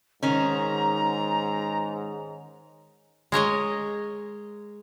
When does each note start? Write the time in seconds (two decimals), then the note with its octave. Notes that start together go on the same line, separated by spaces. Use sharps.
0.23 G#2 D#3 C#4 A#5
3.32 G#3 A#4 C#5 D#5